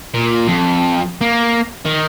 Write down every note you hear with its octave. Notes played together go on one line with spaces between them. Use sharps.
A#2
F2
A#3
D#3